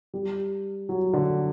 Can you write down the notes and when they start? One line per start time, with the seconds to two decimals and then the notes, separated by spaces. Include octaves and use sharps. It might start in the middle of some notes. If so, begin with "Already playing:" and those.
0.14 G3
0.89 F#3
1.13 D3